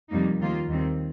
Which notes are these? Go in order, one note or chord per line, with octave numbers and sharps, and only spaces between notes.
F2 C3 G3 A#3 D#4
D#2 D#3 A#3 F4
D#2 D#3 G3 C4